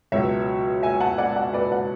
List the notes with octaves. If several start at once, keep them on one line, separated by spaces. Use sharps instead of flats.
C#2 B2 F#3 C#5 E5
E5 G#5
G#5
F#5 A5
D5 F#5
D5 F#5
B4 D5
D5 F#5